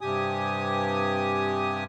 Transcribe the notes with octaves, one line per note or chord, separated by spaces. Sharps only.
G2 C3 G4 G#5 D#6